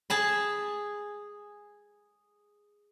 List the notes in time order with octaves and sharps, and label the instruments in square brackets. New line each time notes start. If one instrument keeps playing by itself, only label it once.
[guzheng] G#4 A5 B5